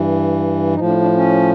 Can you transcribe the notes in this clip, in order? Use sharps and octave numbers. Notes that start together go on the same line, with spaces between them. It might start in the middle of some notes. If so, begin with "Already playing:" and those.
Already playing: G2 E3
A2 F3 D#4
D4
D4
C#4